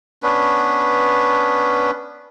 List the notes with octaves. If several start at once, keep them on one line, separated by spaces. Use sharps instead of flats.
B3 C#4 D4 B4